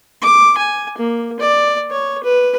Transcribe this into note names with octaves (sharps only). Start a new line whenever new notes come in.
D6
G#5
A#3
D5
C#5
B4